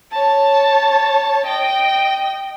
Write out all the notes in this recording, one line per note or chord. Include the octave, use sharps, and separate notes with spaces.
C#5 A5
D#5 G5